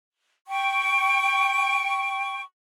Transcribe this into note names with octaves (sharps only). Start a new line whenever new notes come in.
G5 C#6